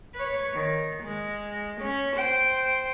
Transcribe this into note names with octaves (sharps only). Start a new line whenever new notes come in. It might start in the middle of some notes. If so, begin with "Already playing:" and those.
B4 C#5
D#3
G#3
C#4
C5 G5